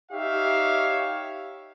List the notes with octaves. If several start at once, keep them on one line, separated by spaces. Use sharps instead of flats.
D#4 G4 C#5 E5 F5